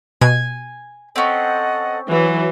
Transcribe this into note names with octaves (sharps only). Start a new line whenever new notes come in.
B2 G#5
C4 C#4 A4 D#5 F#5
E3 F#3